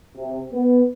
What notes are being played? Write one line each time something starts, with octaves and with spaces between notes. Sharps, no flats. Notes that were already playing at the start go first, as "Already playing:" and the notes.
C3
B3